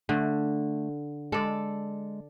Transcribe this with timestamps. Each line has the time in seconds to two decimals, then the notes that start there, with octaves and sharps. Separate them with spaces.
0.09 D3 A3
1.32 G#3 A4 D5